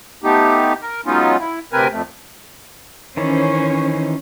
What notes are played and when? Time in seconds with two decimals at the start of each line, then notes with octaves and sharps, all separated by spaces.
0.24 A3 B3 D#4 G4
0.82 A#4
1.06 F#3 G#3 B3 C#4 D#4 F4
1.40 E4
1.73 D2 C3 C4 A#4 B4 G#5
1.91 F2 A3
3.17 D#3 E3 C#4 C5